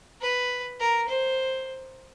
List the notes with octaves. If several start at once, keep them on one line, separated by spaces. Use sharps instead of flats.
B4
A#4
C5